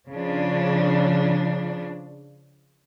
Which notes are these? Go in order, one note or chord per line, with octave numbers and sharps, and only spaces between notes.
C#3 F3 D4